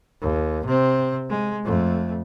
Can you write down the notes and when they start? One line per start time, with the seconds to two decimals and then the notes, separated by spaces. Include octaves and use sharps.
0.22 D#2
0.66 C3 C4
1.30 G#3
1.65 F2 A3